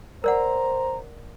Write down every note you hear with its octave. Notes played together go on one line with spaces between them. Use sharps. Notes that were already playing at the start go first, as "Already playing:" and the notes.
A#4 C5 D5 F#5 A#5